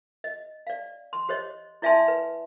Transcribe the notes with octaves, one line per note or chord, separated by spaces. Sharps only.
D#5
D5 F5
C6
G4 C5 C#5 D#5
E4 D5 E5 G#5 A5 C6
B4